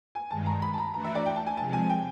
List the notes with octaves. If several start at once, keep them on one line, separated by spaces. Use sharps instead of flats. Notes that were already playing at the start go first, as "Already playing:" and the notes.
G#5
G2 D#3 G#3 A5
A#5
B5
A5
A#5
E3 A3 D4 F#4 A#5
E5
D5
G5
A5
G#5
C3 F3 G#3 A5
G#5
G5